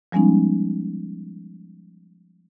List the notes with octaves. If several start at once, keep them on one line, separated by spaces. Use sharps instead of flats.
F3 G3 G#3 B3 C#4 D#4